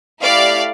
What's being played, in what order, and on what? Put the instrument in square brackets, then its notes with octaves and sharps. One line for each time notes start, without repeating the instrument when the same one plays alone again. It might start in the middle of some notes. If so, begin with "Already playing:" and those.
[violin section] A3 E4 G4 D5 F5